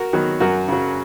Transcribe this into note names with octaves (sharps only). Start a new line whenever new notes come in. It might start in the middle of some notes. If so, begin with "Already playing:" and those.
Already playing: F#4 A#4
D#3 F#3 B3
F#2 F#4 A#4
C#3 F#3